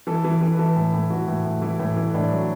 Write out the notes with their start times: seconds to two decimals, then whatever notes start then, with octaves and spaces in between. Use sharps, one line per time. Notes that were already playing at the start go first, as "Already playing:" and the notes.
0.07 E3 A4
0.24 E3
0.41 E3
0.52 B4
0.59 E3 A4
0.76 A2
0.93 A2
1.10 E3 F#4
1.28 A2
1.45 A2
1.62 E3 E4
1.79 A2
1.96 E3
2.14 A2 D4
2.31 F#3